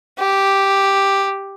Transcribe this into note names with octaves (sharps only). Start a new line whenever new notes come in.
G4